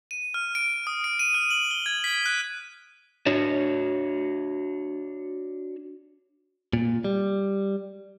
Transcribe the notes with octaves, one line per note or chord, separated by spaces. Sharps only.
D#7
F6
D7
D#6
D7
D#7
F6
F#7
G7
G#6
B6
F#6
D4 F#4 C#5
A#2
G3